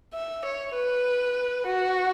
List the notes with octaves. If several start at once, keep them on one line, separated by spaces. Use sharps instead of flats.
E5
C#5
B4
F#4